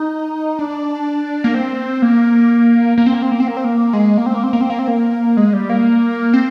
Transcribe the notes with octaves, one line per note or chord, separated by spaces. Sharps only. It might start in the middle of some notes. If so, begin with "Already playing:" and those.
Already playing: D#4
D4
A#3
C4
A#3
A#3
C4
A#3
C4
A#3
C4
A#3
C4
A#3
G#3
A#3
C4
A#3
C4
A#3
C4
A#3
C4
A#3
G#3
G3
A#3
C4